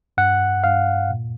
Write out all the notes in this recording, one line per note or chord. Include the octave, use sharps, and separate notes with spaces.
G2 F#5
G2 F5
A#2